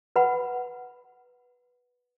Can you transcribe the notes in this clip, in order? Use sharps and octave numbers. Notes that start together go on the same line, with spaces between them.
B4 F#5 B5